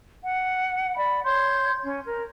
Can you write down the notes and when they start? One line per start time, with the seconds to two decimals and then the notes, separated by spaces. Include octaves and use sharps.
0.23 F#5
0.97 D5 B5
1.24 C#5 C6 G6
1.82 C#4
2.05 A#4